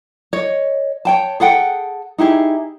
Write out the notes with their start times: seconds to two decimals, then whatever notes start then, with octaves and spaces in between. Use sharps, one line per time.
0.33 C#5 D#5
1.05 C#5 G5 A5
1.40 G#4 A4 F#5 G5
2.18 D#4 E4 G4 G#4